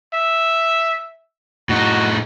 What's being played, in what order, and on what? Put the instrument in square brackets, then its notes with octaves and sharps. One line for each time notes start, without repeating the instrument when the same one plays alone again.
[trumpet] E5
[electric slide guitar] A2 D#4 [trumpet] F#4